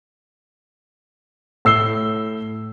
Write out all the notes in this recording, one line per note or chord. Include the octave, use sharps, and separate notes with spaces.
A2 E6 C7 G7